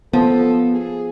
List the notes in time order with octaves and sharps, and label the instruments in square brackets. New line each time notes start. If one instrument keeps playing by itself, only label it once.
[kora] F3 [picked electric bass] B3 [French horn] A4
[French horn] G#4